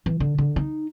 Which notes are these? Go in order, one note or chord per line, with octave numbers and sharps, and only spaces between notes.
E3
D3
D3
D#4